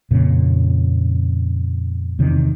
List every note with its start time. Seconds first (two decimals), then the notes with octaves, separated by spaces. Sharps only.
0.11 F2 A#2 C#3
2.19 E2 C3 D#3